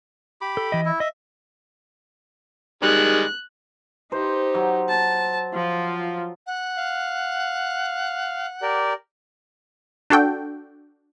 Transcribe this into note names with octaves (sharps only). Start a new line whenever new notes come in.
G4 B5 D6
A4
E3 D#5
E4
D#5 E5
D#3 G3 G#3 F#6
D#4 G4 C5
F#3
A5
F3 F4
F#5
F5
G4 A#4 D5
D4 F#4 A4 G5